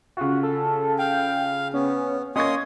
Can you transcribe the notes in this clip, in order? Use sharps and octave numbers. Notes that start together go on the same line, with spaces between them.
C#3 F4 F#4
A4
F5 G5
B3 C#4
A#3 C#4 D#5 C6 C#6 D#6 G#6